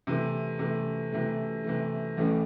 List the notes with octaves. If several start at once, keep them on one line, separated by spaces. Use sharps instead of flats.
C3 E3 A3
C3 E3 A3
C3 E3 A3
C3 E3 A3
A1 A2 E3 A3 C#4